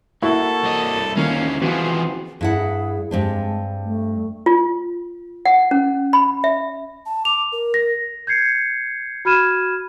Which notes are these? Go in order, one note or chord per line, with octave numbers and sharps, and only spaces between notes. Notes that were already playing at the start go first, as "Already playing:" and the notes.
A#3 E4 F#4 A4
C2 D#5
D2 D#3 A#3 C#4 F4 F5
E3 F3 B3 C4 F4 F#4 G#4
G2 E4 G#4 F#5
G2 G#3 C4 D4
A3
F4
F#5
C#4
B5
E5
A5
D6 F7
A#4
A#6
G6 G#6 C7 C#7
F#4 B5 F6 G#6 D#7 E7